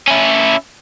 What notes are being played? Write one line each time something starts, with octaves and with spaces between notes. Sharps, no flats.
C#4 E4